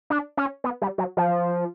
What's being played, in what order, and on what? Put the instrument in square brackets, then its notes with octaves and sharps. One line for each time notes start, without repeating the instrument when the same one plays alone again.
[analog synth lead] D4
C#4
B3
G3
F#3
F3